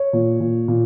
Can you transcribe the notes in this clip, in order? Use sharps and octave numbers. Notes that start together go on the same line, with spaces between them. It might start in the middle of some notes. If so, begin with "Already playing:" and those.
Already playing: C#5
A#2
A#2
A#2